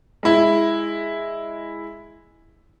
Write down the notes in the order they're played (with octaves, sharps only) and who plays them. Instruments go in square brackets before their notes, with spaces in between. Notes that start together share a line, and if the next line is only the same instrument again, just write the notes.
[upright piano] G#3 E4